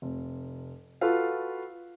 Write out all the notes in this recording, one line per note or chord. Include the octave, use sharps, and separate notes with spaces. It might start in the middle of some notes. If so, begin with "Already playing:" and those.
F1
F4 F#4 A4 B4 F5